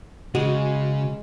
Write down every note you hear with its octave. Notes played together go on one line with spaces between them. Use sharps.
C#3 G#3 F#4